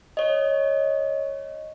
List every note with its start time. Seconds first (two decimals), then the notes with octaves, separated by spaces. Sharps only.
0.17 C#5 D#5